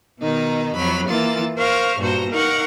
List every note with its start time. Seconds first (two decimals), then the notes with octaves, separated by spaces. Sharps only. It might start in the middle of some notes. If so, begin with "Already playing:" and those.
0.21 B2 D#3 D#4
0.76 F2 F#3 B5 F6
1.09 E3 A#3 F4 A6
1.58 A#4 C5 F5 C#6 F6
2.00 G2 A#2 F#4 C5 A#5
2.31 D#4 A#4 F5 F#5 C#6